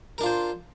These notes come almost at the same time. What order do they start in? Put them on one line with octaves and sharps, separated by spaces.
A#4 D4 F4 C5